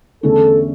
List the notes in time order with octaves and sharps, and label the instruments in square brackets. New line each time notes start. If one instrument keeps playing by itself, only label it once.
[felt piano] E2 D3 A3 C#4 [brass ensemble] A4